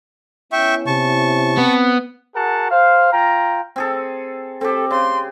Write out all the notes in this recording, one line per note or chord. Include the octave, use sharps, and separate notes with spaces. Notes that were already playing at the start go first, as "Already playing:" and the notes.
B3 C#4 E4 E5 G5 C#6
C3 A5 C#6
B3 C4
F#4 G#4 A#4 F#5 A5
C5 F5
F4 G5 A#5
C4 G#4 A4
C4 G4 A4
C#3 C6